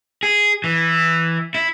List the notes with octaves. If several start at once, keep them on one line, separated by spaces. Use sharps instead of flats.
G#4
E3
E4